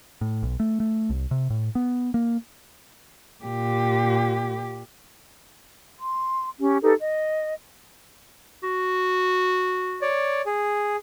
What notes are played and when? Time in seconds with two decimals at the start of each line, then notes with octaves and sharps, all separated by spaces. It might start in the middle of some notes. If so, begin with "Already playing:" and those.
0.21 A2
0.43 B1
0.60 A3
0.80 A3
1.10 C2
1.31 C3
1.50 A2
1.75 B3
2.14 A#3
3.44 A#2 G4
5.98 C6
6.60 C#4 G4
6.82 D#4 G4 A4 B4
7.00 D#5
8.63 F#4
10.02 C#5 D5
10.46 G#4